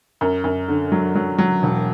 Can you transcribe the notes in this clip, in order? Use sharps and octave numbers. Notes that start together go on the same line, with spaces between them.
F#2
F#2
D3
F#3
F#3
F#3
E1